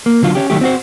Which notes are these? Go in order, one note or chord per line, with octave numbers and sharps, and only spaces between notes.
A#3
D3 F#3 F4
C#4 G4
D#3 F#3 A3 G4
C4 F#4 C5